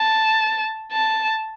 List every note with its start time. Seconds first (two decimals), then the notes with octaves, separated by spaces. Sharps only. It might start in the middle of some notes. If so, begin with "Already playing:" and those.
Already playing: A5
0.92 A5